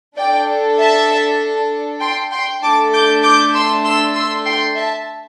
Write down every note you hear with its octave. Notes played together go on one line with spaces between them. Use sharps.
D4 A4 D5 G5
E5 A5
G5 C6
G5 C6
A3 D4 A4 A5 D6
D6 G6
D6 G6
C6 E6
C6 E6
C6 E6
G5 C6
E5 A5